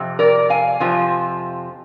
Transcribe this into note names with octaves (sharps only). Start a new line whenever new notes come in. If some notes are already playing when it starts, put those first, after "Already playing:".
Already playing: F2 C3
A#4 D5
F5 G#5
F2 C3 F3